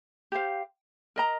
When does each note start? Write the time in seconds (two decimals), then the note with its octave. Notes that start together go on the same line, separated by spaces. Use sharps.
0.32 G4 C5 F5
1.16 A#4 D#5 A#5